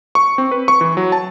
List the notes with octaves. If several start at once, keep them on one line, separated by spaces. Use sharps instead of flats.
C#6
C4
B4
C#6
E3
F#3
A5